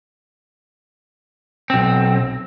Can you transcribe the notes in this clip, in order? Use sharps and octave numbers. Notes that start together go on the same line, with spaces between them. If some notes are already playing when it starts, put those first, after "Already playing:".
B1 C4